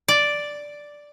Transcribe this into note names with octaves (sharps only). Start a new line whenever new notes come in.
D5